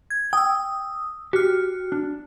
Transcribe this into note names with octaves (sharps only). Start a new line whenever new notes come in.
G#6
G5 D#6 E6
F#4 G4 F6
D4